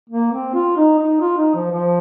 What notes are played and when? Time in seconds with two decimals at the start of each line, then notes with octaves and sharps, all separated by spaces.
0.10 A#3
0.32 C4
0.54 F4
0.77 D#4
0.99 D#4
1.21 F4
1.38 D#4
1.55 F3
1.71 F3